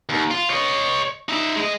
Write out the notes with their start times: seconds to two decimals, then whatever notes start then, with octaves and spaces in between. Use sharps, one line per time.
0.09 D#2
0.31 F4
0.50 C#5 D#5
1.29 D#4 E5
1.57 G#3 D#5